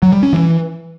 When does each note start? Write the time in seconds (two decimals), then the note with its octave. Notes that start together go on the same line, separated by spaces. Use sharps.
0.03 F#3
0.13 G3
0.23 C#4
0.33 E3